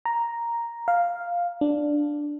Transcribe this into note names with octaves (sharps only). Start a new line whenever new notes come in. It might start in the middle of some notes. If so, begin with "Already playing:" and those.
A#5
F5
D4